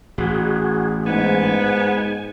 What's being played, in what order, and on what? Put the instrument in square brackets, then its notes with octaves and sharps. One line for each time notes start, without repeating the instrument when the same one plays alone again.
[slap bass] A1 [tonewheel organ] F#4 G#4
[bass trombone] G#2 [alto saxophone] B3 [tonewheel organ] G#5